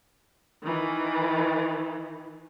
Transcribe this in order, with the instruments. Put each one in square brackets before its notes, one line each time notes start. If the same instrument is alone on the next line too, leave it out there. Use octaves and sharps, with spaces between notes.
[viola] D#3 E3